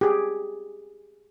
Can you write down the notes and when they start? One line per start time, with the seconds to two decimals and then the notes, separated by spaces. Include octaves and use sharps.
0.01 G4 G#4